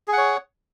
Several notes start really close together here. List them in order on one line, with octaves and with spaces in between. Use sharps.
G#4 F#5 C#5